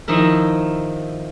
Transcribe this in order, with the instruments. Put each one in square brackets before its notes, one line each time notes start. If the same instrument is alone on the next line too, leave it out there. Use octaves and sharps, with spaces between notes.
[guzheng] D#3 F3 E4 A#4